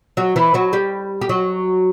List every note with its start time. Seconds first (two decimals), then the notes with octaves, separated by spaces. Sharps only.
0.17 F#3 F#4
0.36 E3 E4
0.54 F#3 F#4
0.73 G3 G4
1.21 G4
1.29 F#3 F#4